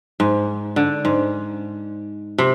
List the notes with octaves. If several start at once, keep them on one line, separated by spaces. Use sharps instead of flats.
G#2
D3
G#2
C3